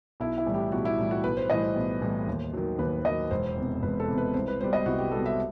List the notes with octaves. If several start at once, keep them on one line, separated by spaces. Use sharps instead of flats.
B1 E4
E4
A2 E3 G3
G4
B1 F#4
E4
A2 E3 G3
F#4
B1 B4
C5
A2 E3 G3 D#5
C5
B1
A2 E3 G3
D#2
D#3 F#3
D#2 B4
D#3 F#3 D#5
E1 C5
E2 C3
E1 B4
A4
E2 C3
B4
C2 C5
B4
B2 G3 C5
D#5
C2 F#4
G4
G3 A4
B2
E5